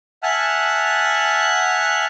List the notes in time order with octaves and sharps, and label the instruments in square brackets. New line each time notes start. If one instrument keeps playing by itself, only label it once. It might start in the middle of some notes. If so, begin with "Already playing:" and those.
[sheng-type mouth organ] E5 F#5 G#5 A5 F6 F#6